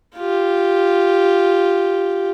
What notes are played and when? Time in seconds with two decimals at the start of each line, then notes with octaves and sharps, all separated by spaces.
0.16 F4 G4